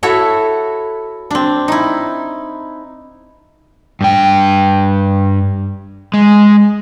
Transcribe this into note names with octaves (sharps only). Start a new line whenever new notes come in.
E4 F#4 A4 C#5 E5
C4 D4
D#4 E4
G2 G5
G#3